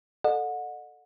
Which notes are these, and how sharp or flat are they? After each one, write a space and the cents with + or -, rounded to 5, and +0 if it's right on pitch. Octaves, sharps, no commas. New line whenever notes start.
A4 +0 D#5 -45 F#5 -30